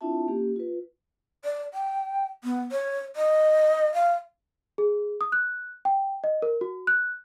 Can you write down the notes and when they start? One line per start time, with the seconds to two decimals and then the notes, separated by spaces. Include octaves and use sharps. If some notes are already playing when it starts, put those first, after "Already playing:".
0.01 C4 D4 E4 F4 E5 A5
0.28 A#3 C#4 G4
0.56 F4 B4
1.45 D5
1.74 G5
2.44 B3
2.72 C#5
3.16 D#5
3.94 F5
4.78 G#4
5.21 D#6
5.32 F#6
5.85 G5
6.24 D#5
6.42 A#4
6.61 F#4
6.87 F#6